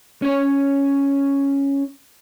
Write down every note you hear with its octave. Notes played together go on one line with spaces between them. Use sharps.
C#4 C#5